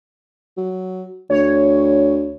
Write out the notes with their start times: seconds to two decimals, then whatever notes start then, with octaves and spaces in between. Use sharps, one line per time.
0.57 F#3
1.30 D2 C#5